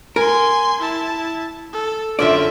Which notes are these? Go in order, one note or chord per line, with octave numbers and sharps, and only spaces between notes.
A#4 G#5 C6
E4 A5
A4
F#2 D3 F4 D5 E5